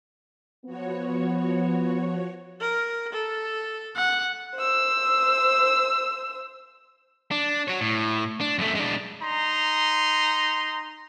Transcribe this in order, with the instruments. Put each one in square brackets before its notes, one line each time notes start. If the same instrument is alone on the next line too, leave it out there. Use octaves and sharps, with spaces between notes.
[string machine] F3 F#4 C#5 [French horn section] B3
[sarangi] A#4
A4
[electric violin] F#5
[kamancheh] C5 E6
[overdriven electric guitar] D4
F#4 C#5
A2
D4
F#2 A3
G#3 D4
[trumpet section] D#4 A#5 C6